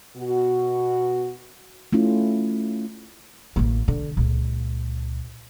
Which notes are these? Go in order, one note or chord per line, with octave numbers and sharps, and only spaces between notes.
B2 F#4
A3 C#4 E4 F4
A1 A#3
D3
C#2 A#2